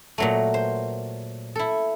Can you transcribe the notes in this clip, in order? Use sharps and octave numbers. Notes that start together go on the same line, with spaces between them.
A#2 F#3 A3
C5
E4 A4